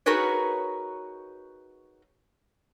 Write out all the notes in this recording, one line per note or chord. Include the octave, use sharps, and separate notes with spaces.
D#4 F#4 G#4 A#4 B4 C#5